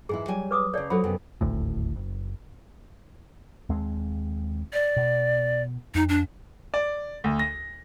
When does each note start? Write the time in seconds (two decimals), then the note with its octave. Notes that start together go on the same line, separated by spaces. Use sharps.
0.09 G#2 E3 E4 G#4
0.28 F#3 G3 G#5
0.51 B4 D6 D#6
0.74 C#3 A4 C#5 D5
0.90 F#3 F#4 A4 C5 B5
1.04 F#2 C3 B3
1.41 D#1 G#1 D2 A2
1.96 F#1
3.69 D#2 G#3 C4
4.73 D5
4.97 B2
5.95 F2 D#4
6.09 D4
6.74 D5
7.24 D2
7.39 A#6